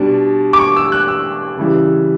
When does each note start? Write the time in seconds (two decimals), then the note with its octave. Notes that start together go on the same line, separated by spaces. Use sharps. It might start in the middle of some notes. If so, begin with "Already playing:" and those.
Already playing: B2 G3 D4 A5
0.53 D6
0.59 C#6
0.76 E6
0.92 F#6
1.08 E6
1.57 C#3 E3 G3